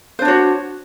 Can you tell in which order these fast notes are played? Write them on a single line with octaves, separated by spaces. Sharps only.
C5 D4 C#5 F#4